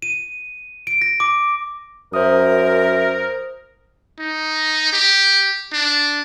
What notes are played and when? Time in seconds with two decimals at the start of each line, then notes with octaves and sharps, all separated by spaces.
0.02 D#7
0.87 D7
1.02 A#6
1.20 D6
2.14 F#2 A#4 C5 E5 D#6
4.20 D#4
4.93 G4
5.73 D4